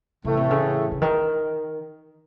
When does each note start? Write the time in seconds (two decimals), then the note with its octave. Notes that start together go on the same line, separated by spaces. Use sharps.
0.25 A2 C#3 E3 A3
0.37 C3
0.50 C#3
0.92 C#3
1.02 D#3